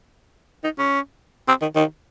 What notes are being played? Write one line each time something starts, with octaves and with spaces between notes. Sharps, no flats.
D#4
C#4
C4
D#3
D#3